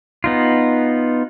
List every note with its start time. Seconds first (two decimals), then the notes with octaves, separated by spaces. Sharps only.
0.24 B3 D#4 F4